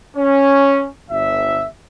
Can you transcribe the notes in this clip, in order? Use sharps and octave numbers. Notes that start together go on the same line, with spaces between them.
C#4
G1 E5